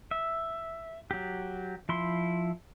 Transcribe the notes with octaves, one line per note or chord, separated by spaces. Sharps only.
E5
F#3 G4
F3 E4 C6